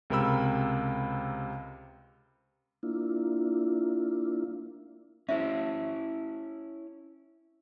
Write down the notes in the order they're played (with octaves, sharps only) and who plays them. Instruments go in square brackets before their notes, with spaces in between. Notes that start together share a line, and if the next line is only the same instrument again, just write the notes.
[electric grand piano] C#2 C3 A#4 G5 B5 E6
[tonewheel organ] A#3 D4 E4 F4
[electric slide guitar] C#4 E4 [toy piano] G#4 C5 E5